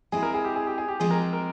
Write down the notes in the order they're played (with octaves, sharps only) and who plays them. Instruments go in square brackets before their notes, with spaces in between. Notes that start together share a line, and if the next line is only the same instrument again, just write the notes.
[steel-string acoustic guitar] G#3 C4 E4 [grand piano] G#4
[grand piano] A#4
G#4
G4
G#4
G4
G#4
G4
[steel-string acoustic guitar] F3 G#3 C4 G4 [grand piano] G#4
[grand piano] A#4
A#4